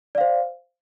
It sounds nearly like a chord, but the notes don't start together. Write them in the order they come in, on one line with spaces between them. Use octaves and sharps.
D5 F5 C5